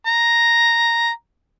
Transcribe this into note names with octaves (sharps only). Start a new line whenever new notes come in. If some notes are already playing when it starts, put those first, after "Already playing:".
A#5